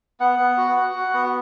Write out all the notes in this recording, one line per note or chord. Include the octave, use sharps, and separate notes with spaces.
B3 F#5
B3
F#4
F#4
F#4
B3